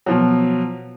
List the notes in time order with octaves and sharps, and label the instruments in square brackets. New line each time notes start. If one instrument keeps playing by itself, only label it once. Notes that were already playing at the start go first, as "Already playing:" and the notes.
[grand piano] B2 F3 F#3